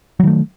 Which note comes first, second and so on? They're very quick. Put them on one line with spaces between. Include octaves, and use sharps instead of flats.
F#3 D#3 A3